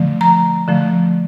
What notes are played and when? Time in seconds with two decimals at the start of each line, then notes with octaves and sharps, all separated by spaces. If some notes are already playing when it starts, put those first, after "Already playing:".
Already playing: D3 F3 A3
0.21 A#5
0.68 D3 F3 A3